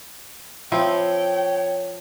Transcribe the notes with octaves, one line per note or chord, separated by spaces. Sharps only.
F3 C4 E4 C#5 G5